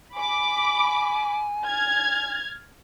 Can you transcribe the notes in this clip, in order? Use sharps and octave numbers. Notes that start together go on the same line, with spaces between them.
G#5 B5 D6
F6 G#6 A6